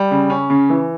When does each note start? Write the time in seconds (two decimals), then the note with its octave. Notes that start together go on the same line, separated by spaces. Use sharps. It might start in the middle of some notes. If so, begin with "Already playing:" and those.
Already playing: G3
0.11 C#3
0.30 C#4
0.50 C#3
0.70 E3